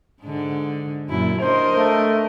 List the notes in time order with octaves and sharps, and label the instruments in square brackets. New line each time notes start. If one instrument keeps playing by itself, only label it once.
[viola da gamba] G#2 D3
F#2 A#2 E4
[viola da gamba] D4 A#4 D#5 [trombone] C5
[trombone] A3